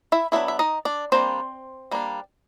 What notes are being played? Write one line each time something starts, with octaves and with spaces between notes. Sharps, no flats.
E4 E5
F#3 B3 D4 E4 E5
E5
D#4 D#5
D4 D5
G3 A#3 C4 D4 C5
G3 A#3 D4